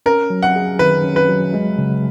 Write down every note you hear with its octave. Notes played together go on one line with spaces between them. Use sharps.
C#4 A#4
F#3
F#5
G#4
D#3 B4
C#4
B4
F#3
G#3
C#3